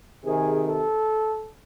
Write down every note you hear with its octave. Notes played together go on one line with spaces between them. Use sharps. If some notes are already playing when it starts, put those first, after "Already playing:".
C3 D#3 G#4
A4